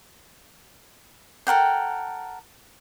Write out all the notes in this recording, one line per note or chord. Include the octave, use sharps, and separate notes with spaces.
A4 A#4 F#5 G5